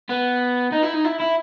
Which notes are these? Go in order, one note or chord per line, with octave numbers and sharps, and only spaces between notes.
B3
D#4
E4
D#4
E4
E4